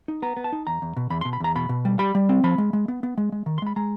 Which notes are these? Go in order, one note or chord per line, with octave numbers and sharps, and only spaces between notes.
D#4
B3 A#5
B3
A5
D#4
E2 A#5
E2
B2
E2 B5
B2 C6
B5
E2 A#5
B2 B5
B2
G3
G3 B5
G3
C4
F3 B5
G#3
G#3
B3
B3
G#3
G#3
D#3
C6
G#3 B5
G#3 A#5